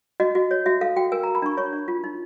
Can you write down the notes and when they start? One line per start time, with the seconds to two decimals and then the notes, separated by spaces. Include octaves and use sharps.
0.20 F#4 D#5
0.35 F#4
0.51 C#5
0.66 F#4 E5
0.81 A4 F5
0.96 F#4 G5
1.12 A#4 G#5
1.23 A#5
1.27 A#4
1.35 B5
1.42 D4 C#6
1.57 C#5 C#6
1.73 D4
1.88 F4
2.04 D#4